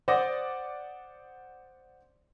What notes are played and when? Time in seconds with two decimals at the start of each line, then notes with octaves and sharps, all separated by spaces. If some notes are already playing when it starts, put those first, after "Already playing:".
0.08 C5 D5 F#5 D6 D#6 A#6